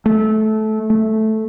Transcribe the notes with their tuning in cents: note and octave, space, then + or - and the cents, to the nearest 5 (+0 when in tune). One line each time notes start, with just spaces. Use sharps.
A3 -20
A3 -5